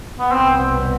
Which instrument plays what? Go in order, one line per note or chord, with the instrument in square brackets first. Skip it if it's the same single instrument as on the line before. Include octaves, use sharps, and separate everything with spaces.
[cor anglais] B3
[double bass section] C2 B2 G3 B3 [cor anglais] C4